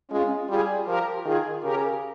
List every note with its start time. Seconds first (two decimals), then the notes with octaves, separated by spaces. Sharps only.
0.11 G#3 C#4 F4
0.49 G3 F4 G#4
0.87 F3 G4 A#4
1.25 D#3 F4 G#4
1.63 C#3 G4 A#4